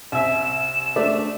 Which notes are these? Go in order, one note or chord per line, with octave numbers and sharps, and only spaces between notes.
C2 E5 E7
A3 D4 D5